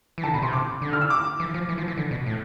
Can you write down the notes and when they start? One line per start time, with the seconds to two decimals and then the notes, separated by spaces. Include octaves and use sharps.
0.18 E3
0.24 D3 A5
0.34 B2 B5
0.42 C3 C6
0.53 D6
0.82 D3
0.93 F6
1.01 E6
1.10 D6
1.40 E3
1.54 F3
1.69 E3
1.78 F3
1.88 E3
1.98 D3
2.11 B2
2.26 A2